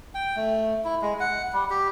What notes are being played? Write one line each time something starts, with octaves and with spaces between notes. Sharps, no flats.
G5
A3
E4
G#3
F#5
G3
G4